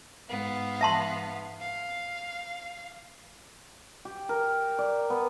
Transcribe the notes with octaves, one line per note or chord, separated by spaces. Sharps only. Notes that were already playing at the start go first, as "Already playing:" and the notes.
G#2 B3 F5
E5 A5 C6
F5
G4
A#4
D5
B3